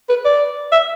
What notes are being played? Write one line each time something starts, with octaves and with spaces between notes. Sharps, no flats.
B4
D5
E5